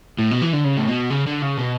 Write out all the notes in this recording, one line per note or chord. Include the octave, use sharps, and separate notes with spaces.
A2
B2
E3
D3
C#3
A2
B2
C#3
D3
C#3
B2